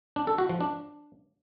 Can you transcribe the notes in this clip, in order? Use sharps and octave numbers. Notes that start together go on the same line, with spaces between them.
D4
A4
F#4
F3
D4